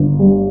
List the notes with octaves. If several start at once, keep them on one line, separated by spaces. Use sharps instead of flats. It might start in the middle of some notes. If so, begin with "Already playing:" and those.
Already playing: G1
G3